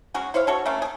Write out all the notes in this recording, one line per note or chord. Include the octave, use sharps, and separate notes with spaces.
F#3 G#3 C#4 F#4
E4 C5 C#5 F5
D4 F#4 A4 C#5
A3 A#3 C#4
G#4 A4